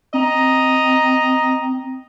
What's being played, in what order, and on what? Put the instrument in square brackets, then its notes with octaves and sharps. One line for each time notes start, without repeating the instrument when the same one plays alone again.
[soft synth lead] C4 [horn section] D#5 A#5